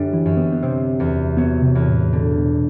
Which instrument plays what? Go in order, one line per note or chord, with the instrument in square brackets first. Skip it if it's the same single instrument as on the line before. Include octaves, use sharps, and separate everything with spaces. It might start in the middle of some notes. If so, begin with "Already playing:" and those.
Already playing: [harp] F#2 D3 G3
[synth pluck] E3
[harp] F#2
[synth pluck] B3
B3
[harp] C3 [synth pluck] C4
[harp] E2
[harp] F#3 [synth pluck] B3
[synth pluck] C3
[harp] E2
[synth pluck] A2
[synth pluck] B2 [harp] D3
[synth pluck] B2